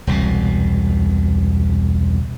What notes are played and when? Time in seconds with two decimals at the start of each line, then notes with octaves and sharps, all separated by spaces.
0.07 E1 C2 B2